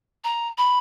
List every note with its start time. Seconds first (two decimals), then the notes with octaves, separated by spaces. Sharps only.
0.24 A#5
0.58 B5